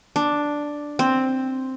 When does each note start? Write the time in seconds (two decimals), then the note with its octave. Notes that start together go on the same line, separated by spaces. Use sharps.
0.16 D4
0.99 C4